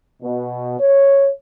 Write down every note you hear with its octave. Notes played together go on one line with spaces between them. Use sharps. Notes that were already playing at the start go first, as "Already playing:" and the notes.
B2
C#5